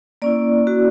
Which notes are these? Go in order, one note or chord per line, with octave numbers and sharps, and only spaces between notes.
A#3 C#4 E4 D5
F#4